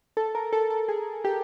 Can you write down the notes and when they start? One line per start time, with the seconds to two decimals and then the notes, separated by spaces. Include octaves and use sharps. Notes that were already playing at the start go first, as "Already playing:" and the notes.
0.17 A4
0.35 A#4
0.53 A4
0.70 A4
0.88 G#4
1.24 G4